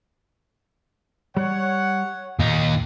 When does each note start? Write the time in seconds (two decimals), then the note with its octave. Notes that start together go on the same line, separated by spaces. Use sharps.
1.37 G3 C#5 F#5
2.39 D#2 A#2 D#4